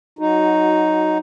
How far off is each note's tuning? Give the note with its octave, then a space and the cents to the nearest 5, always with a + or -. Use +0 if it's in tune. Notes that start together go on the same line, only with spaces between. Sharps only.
F#3 +0 D#4 +0 F#4 -15